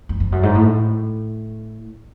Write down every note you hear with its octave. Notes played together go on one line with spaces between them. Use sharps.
F2
F2
F#2
G#2
A2